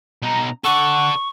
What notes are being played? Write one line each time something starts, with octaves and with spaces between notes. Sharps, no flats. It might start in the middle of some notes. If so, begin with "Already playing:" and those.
B2 D#4 A#5
A4 D5 F#5 C#6